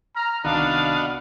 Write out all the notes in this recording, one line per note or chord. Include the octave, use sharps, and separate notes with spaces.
A#5 F6
C2 D#3 B3 D4 F#4 D#5 F5